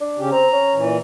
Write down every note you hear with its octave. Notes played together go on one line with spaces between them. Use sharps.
D4
C#3 C#4 G4
C4 A#5
C#4
A#2 E3